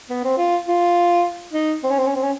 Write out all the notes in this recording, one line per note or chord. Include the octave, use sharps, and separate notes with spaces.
B3
C4
F4
F4
D#4
C4
C#4
C4
C#4
C4
C#4